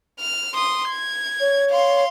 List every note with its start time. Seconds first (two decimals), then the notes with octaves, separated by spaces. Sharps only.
0.20 F6
0.54 C6 D#6
0.89 G#6
1.40 C#5
1.70 F5 C6